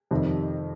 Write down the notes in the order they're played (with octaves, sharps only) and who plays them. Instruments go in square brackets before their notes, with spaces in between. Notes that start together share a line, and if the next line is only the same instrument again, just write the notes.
[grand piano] F2 C3 D#3 G3